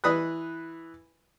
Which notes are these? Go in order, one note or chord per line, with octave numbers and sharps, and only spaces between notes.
E3 B4 D#6 F#6